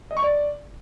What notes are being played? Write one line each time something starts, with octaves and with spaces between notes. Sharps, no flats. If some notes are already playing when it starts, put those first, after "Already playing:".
D#5
C#6
D5